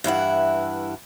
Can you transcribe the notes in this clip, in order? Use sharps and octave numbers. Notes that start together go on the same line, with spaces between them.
G2 E3 E4 F#5